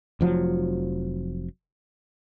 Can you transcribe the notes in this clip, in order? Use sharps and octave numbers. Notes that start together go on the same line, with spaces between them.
F1 F3 F#3